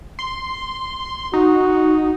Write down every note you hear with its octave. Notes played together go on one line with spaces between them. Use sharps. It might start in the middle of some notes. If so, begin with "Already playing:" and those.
C6
D#4 F#4